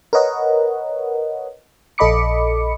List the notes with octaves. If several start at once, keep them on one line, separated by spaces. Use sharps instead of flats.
A#4 B4 C#5 D#5 F#5
A#1 A4 D#5 B5 D6 C#7